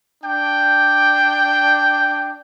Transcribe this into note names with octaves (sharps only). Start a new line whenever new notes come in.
D4 G5